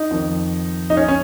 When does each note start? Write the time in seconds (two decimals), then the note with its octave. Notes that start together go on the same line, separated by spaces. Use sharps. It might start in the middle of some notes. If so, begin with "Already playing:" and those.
Already playing: D#4
0.11 F2 D#3
0.90 D#4
0.97 C#4
1.08 C#4